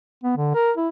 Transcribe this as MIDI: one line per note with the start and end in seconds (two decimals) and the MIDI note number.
0.24 0.35 59
0.37 0.55 50
0.55 0.71 70
0.77 0.88 64